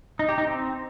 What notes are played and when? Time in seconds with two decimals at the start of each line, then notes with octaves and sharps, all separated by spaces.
0.19 D#4
0.29 G4
0.38 D#4
0.47 C4